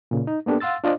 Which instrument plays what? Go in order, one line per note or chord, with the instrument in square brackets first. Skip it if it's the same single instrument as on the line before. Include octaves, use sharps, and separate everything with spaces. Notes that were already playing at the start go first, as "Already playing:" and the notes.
[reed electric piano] A#2 C#3
D#4
A#3 B3 D4 G4 A4
F5 F#5 C6 E6 A6
D4 F4 C5 D5 D#5